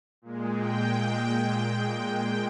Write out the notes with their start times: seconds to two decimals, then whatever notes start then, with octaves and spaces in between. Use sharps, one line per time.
0.22 A#2 G#3
0.57 G5